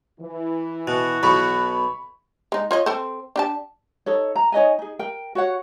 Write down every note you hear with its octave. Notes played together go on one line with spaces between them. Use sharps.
E3
B2 F#4
B1 B2 B5 C#6
G#3 D#4
F4 C#5 D#5
C4 A4 C5
D4 G4 A5
D#4 A4 C#5
A#5
D#4 C#5 D#5 G#5
D#4 G#4
A#4 G5
F#4 C#5 F#5